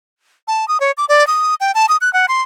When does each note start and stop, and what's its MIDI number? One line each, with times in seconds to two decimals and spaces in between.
0.48 0.68 81
0.68 0.80 87
0.80 0.91 73
0.97 1.05 86
1.09 1.26 74
1.27 1.55 87
1.60 1.71 79
1.75 1.86 81
1.89 1.97 87
2.01 2.12 90
2.13 2.26 78
2.28 2.42 84